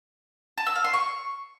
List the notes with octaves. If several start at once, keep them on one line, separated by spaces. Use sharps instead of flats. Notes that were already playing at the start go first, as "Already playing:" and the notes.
A5
E6
F5
C6
C#6